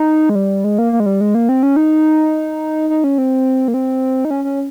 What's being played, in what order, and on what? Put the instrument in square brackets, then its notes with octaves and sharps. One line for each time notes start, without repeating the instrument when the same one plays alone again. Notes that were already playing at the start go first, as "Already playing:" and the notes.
Already playing: [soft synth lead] D#4
G#3
G3
G#3
A#3
A#3
G#3
G3
G#3
A#3
C4
C#4
D#4
D#4
C#4
C4
A#3
C4
D#4
C#4
C#4